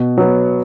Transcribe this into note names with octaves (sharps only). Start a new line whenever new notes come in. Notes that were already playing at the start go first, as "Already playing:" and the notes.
Already playing: B2
F#3 B3